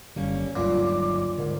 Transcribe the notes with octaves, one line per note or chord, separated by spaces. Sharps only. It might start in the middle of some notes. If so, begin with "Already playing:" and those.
F#1 D3 G3 A#3 C#4
G1 D2 G2 A#2 D#3 F#3 D6
G#2 B2 D3 A#4